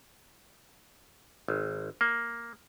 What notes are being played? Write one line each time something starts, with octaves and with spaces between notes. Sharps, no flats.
G#1
A#3